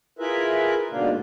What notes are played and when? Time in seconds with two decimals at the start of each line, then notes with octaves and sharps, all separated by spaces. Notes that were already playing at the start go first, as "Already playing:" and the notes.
0.19 E4 F4 G#4 A#4 B4 E5
0.90 G#2 B2 D3 A#3 D4 F4